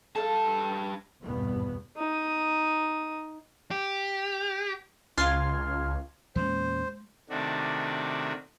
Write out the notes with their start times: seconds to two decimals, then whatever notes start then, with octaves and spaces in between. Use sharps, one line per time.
0.16 G2 A4 F5 A5
1.22 G#1 E2 G2 B2 B3
1.96 D#4 D#6
3.71 G4
5.18 C#2 F4 C6 F6 G#6
6.36 E2 A#2 G#3 C#4 C5
7.30 C3 D#3 A3 D4 F#4